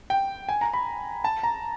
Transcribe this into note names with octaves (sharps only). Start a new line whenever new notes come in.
G5
G#5
A#5
B5
A5
A#5